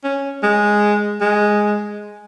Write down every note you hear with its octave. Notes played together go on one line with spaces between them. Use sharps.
C#4
G#3
G#3